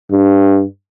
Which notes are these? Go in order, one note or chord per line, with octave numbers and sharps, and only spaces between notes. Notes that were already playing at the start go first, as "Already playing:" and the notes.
G2